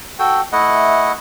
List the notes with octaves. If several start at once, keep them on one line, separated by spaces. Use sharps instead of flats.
F#4 A4 G5
A3 E4 D#5 F#5